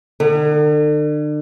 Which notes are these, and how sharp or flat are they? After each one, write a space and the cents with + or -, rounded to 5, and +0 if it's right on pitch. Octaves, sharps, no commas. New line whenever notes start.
D3 +40